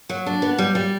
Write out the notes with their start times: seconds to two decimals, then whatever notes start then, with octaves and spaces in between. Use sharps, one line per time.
0.09 F#3
0.26 D4
0.42 B3
0.58 G3
0.75 G3